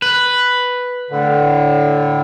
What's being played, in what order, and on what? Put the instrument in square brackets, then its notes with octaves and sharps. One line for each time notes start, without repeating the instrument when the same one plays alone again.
[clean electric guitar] B4
[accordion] A2 D3